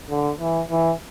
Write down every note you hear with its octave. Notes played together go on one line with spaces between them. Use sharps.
D3
E3
E3